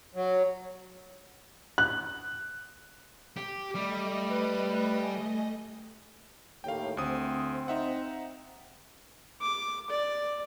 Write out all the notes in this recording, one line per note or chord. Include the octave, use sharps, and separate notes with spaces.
F#3
F#6
G4
G3 A3 D#5 D6
B4
G#5
D#2 A2 F5 G5
D2 C4 D#6
D#4 E5 F#5
D6
D5